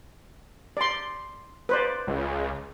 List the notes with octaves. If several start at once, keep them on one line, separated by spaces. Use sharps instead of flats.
D5 C6
B4 C5 D5
C#2